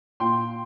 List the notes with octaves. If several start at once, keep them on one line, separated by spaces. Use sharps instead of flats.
A#2 G5 C6